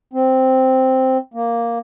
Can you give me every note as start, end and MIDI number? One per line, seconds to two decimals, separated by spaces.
0.13 1.18 60
1.34 1.78 58